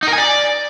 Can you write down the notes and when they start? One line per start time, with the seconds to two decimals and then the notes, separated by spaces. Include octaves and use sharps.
0.03 D#4
0.08 A#4
0.13 G#5
0.18 D5